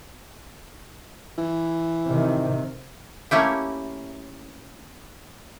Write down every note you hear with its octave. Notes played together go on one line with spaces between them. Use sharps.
E3
C3 D#3
A3 A#3 C#4 E4 G4